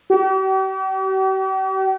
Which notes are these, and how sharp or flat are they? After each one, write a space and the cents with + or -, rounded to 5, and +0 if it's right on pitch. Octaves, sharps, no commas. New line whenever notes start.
G4 -45